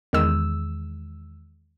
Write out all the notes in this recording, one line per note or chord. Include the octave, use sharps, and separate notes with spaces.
E2 D#3 G#3 E6